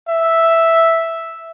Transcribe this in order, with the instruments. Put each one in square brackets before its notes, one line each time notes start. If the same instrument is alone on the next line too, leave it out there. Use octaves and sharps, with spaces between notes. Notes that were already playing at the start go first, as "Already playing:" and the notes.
[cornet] E5